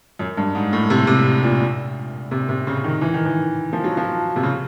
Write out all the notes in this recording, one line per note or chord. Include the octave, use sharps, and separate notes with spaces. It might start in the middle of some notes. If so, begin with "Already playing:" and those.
F#2
G2
G#2
A2
C3
C3
A#2
C3
C3
C#3
D#3
E3
D#3
E3
F3
F#3
F3
C3
C#3